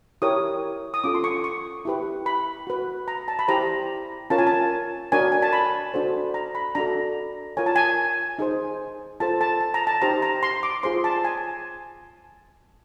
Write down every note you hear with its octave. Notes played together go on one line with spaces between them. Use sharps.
E4 G4 A#4 C#5 D#6
D#6
C#4 F4 A4 D6
C6
C#6
C#6
E4 G4 B4
B5
F#4 B4
A#5
A5
B5
E4 G4 C5 A#5
C#4 F4 A#4 C#5 A5
G#5
A5
D4 F#4 A#4 C#5 G#5
G#5
A5
B5
D4 F#4 A4 C5
A#5
B5
D4 F#4 A4 A#5
F4 A#4 C#5 G#5
A5
G#5
D#4 G#4 C5
F4 A4 C5 A5
A5
A5
A#5
A5
D#4 G4 C5 A#5
A#5
C6
D6
F4 G#4 C5 C6
A5
G#5